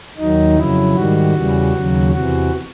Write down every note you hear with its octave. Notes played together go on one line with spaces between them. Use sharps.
D#2 D#3 F#3 D#4
F2 C#3 F#3 E4
G#2 D#3 G3 F#4
E2 C#3 E3 G3
D#2 C#3 F#3
E2 C3 E3 F#4